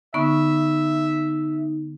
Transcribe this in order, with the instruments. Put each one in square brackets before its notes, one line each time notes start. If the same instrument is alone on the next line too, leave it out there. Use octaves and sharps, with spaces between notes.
[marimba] D3 B3 C#6 [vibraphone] D#4 [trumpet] E5